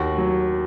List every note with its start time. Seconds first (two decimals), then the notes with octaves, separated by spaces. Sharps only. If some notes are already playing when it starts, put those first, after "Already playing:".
Already playing: D#2 F#4
0.18 F#3